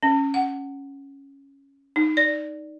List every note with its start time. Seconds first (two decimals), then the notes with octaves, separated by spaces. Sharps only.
0.03 C#4
0.34 F#5
1.96 D#4
2.17 D5